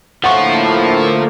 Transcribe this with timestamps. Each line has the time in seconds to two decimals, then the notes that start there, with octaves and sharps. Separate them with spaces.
0.24 A2 D3 F3 A3 A#3 F4 F#5 C#6